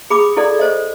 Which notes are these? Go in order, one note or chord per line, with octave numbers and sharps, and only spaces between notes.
G#4 B5 D6 D#6
E4 A4 D5
A4 C5 D#5